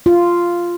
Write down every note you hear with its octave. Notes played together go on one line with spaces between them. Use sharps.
F4